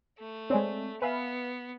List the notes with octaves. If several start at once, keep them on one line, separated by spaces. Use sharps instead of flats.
A3
G#3 C4 C#5 D5 G#5
B3 B4 E5 F5 G#5 B5